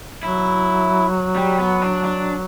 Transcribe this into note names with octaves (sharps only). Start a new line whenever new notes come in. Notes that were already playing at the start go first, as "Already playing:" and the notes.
F#3 E4
G3
B3
D4
D4